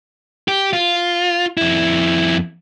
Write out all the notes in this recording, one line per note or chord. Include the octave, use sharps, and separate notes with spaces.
G4
F4
F2 E4